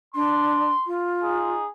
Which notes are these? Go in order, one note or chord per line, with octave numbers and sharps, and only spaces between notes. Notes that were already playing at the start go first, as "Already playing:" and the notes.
D4 C6
F4
D#4 G#4